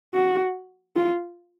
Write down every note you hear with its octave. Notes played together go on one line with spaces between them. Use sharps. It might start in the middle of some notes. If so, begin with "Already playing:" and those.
F#4
F4